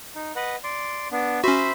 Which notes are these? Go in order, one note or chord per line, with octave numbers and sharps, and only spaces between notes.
D#4
B4 D#5 F#5
D5 C6
B3 D4
C#4 F#4 C5 E5 B5